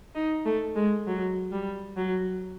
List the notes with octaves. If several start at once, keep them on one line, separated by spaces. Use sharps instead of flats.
D#4
A3
G#3
F#3
G3
F#3